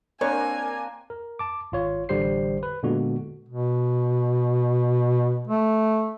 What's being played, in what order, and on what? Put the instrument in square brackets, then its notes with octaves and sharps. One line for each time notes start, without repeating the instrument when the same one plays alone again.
[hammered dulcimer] A#3 C4 D4 [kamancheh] A#4 G#5 [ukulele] C#5
[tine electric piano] A#4
A5 D6
G#1 F4 C#5
A1 D3 G3 G4 C5 C7
B4
A#2 D3 G#3 B3 F#4
[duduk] B2
A3